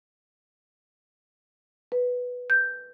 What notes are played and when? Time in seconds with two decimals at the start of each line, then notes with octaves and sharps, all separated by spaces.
1.92 B4
2.50 G6